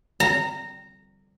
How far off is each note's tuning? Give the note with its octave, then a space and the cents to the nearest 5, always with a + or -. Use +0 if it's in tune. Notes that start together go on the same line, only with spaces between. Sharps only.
A#5 -15